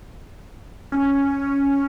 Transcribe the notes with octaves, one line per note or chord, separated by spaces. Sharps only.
C#4